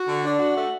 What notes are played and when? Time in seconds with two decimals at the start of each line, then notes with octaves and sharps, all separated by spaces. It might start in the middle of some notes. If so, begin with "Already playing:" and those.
Already playing: F#4
0.08 D3
0.24 D4
0.40 F#4
0.55 A3